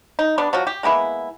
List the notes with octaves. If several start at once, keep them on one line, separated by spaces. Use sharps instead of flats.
D#4
G3 B3 D4
F3 F#3 F#4
G4
G#3 A#3 B3 E4